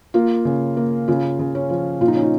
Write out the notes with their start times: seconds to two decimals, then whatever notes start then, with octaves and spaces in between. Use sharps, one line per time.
0.14 A#3 F4
0.45 C#3
0.77 A#3
1.08 C#3 F4
1.39 C#3
1.55 C#4
1.70 F3
2.01 A#2 F4
2.08 D#4
2.15 C#4
2.23 D#4